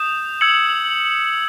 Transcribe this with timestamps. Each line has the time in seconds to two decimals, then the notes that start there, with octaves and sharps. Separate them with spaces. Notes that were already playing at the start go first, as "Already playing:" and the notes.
Already playing: D#6 G6 E7
0.41 E6 G#6 C#7 F#7